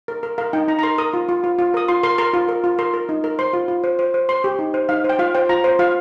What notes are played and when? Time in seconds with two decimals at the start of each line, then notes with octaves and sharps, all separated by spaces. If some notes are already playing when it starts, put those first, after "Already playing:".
0.08 A#4
0.23 A#4
0.38 A#4 F5
0.53 D#4 G5
0.68 D#4 A#5
0.79 A#5
0.83 A#4 C6
0.98 A#4 D#6
1.14 F4
1.29 F4
1.44 F4
1.59 F4
1.74 A#4 D#6
1.88 F4 C6
2.03 A#4 C6
2.18 A#4 C6
2.34 F4
2.48 A#4
2.64 F4
2.79 A#4 C6
2.94 A#4
3.09 D#4
3.24 A#4
3.39 C5 C6
3.53 F4
3.68 F4
3.84 C5
3.99 C5
4.14 C5
4.29 C5 C6
4.44 G4
4.59 D#4
4.74 C5
4.89 D#4 F5
5.04 C5
5.09 G5
5.19 F4 F5
5.35 C5 G5
5.49 F4 A#5
5.64 C5
5.79 F4 F5